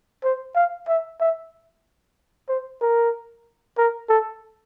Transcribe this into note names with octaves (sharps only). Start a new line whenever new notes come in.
C5
F5
E5
E5
C5
A#4
A#4
A4